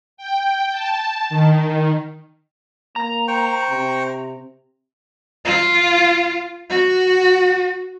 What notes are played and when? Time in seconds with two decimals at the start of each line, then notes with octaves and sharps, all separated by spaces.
0.17 G5
0.71 A5
1.30 D#3
2.96 A#3 A#5
3.28 C5 G5 C#6
3.70 C3
5.45 F4
6.70 F#4